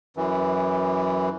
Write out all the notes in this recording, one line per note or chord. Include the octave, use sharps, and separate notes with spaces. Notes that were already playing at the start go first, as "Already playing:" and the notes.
F#2 E3